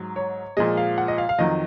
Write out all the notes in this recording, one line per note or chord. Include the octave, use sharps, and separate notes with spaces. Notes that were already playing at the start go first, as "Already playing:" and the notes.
Already playing: G#2 F#3
C#5
A#2 F3 G#3 D#5
F5
F#5
D#5
F5
F5
F2 D#3 F#3 D#5